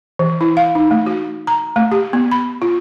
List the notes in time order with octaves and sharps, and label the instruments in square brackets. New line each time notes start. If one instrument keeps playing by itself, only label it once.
[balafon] E3
E4
F5
D#4
A3
F#4
A#5
A3
G4
B3
B5
F4